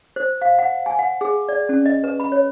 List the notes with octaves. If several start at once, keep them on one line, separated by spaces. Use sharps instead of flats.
C5
F5
F#5
G#5
F#5
G#4
D5
C#4
D#5
B4
B5
C#5